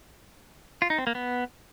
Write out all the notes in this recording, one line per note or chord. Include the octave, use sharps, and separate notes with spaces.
F4
D#4
C4
A#3
B3